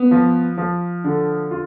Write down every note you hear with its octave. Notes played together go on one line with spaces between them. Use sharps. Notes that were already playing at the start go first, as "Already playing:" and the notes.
Already playing: B3
F3
F3
D3
F4